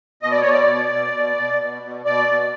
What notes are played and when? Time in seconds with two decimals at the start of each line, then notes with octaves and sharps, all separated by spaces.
0.22 B2 D#5
0.32 D5
0.41 C#5
0.46 B2 D5
0.68 B2
0.91 B2
1.13 B2
1.37 B2
1.59 B2
1.82 B2
2.05 B2 D5
2.28 B2